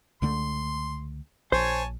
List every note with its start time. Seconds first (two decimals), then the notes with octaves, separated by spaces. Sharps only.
0.22 C#2 D3 A3 C6
1.52 A#1 C5 C#5 G#5 A5